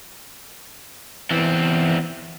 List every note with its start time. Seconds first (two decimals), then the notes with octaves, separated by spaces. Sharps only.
1.31 E2 E3 C4